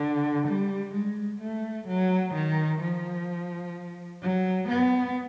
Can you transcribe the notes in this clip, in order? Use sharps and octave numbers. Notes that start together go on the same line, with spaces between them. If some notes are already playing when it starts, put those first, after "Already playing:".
Already playing: D3
G3
G#3
A3
F#3
D#3
F3
F#3
B3